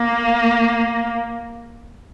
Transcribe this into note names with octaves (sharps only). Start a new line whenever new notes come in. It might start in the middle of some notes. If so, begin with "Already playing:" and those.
Already playing: A#3